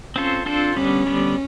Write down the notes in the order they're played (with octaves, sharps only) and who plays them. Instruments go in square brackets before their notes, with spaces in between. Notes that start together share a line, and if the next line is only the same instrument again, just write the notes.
[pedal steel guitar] C4 F4 A4 C5 [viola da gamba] C#4
[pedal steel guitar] C4 F4 A4 C5 [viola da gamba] D4
[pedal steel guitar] D3 G3 B3 D4 [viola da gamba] C#4
[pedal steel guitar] D3 G3 B3 D4